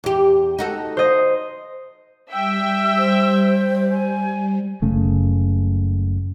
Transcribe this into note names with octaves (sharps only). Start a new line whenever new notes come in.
E2 G4
D#4 F#4 A4
C5 D#5
G3 E5 G5 E6
C5
G#5
F#1 C#3 A3